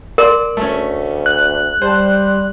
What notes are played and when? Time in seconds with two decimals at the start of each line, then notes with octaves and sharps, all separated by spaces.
0.18 A#4 D5 C6
0.57 D2 A3 C#4
1.26 F#6
1.82 G3 C5 A5